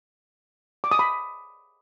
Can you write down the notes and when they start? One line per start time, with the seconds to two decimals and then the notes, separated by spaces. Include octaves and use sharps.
0.84 D6
0.91 D#6
0.99 B5